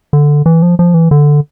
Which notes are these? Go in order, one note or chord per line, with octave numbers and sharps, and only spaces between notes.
D3
E3
F3
F3
E3
D3